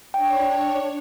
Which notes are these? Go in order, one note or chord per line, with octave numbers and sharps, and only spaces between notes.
D4 C#5 G5